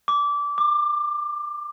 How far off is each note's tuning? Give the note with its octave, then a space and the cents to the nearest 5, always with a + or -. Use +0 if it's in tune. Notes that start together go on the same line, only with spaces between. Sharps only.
D6 -20
D6 +20